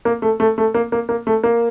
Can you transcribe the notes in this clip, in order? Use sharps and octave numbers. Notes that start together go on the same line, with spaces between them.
A#3
A3
A3
A3
A#3
A#3
A#3
A3
A#3